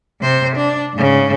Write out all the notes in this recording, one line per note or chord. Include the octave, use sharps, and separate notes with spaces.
C3 C5
D4
G#2 C#3